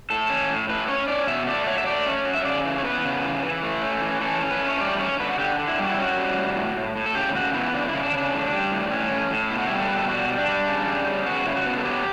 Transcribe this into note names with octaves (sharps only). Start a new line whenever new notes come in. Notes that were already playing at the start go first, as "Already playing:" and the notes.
A2 A4
C#4
A2
A2 B4
C#4 C#5
C#4 D5
B2 E5
A3 D5
F#3 C#5
E5
A3 D5
C#4
F#3
E5
C#3 D5
E3
C#5
B3 B4
C#3
E3
E3
A3
C#4
E3
C#4 A4
C#4
B4
A3
C#5
G3 D5
C#4 C#5
D3 B4
F#4
D3 G4
D3
E4
G3 F#4
E4
C#4 F#4
G3
A2
A2
A2
A2
A4
C#3 G4
C#3 F#4
B3 E4
C#3 D4
E4
C#3
D4
C#3
D4
A2
G3
A2
C#4
A2
A2
B2 E4
F#4
G3 E4
A4
B2 B4
A4
G3 F#4
G3
D4
G3
C#3
G3
C#3
B3 F#4
C#3 E4
F#4
B3
A4
F#3 G4